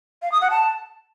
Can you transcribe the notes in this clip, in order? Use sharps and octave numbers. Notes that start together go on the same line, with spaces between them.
F5
D#6
F#5
A5